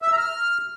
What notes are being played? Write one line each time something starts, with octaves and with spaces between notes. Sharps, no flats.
E5
E6
A#5
F6